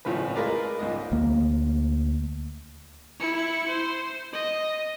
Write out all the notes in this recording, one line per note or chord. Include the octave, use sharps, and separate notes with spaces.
G#1 A2 C#3 F3 B4
G#3 A#4 B4 D5 F5
C#2 G#2 D#5
D2 A#3
E4 C#7
C5
D#5